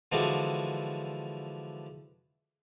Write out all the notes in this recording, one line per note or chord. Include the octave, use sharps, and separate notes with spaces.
D3 E3 F3 G#3 D4 F#4